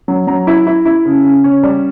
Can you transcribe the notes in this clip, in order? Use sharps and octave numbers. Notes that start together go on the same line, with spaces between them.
F#3
F#3 A#5
E4
E4
E4
C#3
C#3
C#4
G3